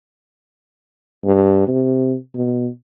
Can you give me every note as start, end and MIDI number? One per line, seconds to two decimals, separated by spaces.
1.24 1.63 43
1.67 2.15 48
2.35 2.67 47